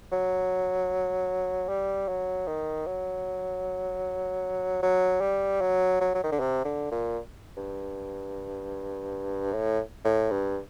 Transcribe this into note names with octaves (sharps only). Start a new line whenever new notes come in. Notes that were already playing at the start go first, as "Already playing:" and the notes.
F#3
G3
F#3
D#3
F#3
F#3
G3
F#3
F#3
F#3
D#3
D3
C3
D3
A#2
G2
A2
A2
G2